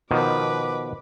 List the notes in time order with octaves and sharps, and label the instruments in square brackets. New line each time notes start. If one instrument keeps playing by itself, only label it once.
[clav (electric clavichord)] B2 D#3 F3 [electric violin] B4 D6